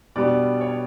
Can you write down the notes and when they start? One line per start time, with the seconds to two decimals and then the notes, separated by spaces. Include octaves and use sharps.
0.16 B2 G3 B3 D4 D5
0.61 C#5